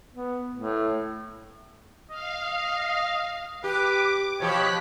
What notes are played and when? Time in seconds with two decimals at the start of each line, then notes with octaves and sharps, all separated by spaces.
0.14 B3
0.55 A2
2.11 D#5 F5
3.64 G4 B4 D6
4.40 B2 F3 G4 C#5 F#6 B6